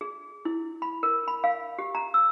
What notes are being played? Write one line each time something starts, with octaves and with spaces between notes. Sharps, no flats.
G#4
E4
B5
A#4
B5
F5
G4
A#5
E6